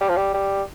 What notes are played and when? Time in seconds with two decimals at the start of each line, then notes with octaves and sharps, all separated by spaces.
0.01 G3
0.09 F3
0.17 G3
0.34 G3